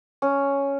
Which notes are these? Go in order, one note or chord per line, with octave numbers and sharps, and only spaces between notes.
C#4